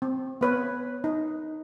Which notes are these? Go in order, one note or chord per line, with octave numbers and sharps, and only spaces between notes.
C4
B3 B4 C#5
D#4